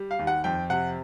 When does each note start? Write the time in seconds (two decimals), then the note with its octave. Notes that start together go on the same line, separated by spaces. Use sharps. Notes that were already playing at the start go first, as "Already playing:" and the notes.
Already playing: G3
0.11 F5
0.19 D#2
0.27 F#5
0.44 F2 G5
0.70 C3 F#5